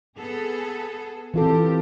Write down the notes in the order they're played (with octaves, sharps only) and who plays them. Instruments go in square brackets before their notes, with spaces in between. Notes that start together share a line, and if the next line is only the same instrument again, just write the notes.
[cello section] B3 G#4 A4
[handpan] E3 F4 A4 [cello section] C4 G4